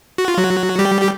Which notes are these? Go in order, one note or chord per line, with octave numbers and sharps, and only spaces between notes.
F#4
F4
F#3 F#4
G3 G4
G4